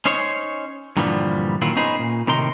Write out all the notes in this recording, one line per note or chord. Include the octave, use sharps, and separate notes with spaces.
C#4 D#4 C5 C#5
G2 A#2 D3 E3 F3 G3
A#2 D#3 F#3 E4 F4
B3 C#4 D#4 G#4 B4 C5
A#2
A2 C3 D#3 D#4 A#4 C6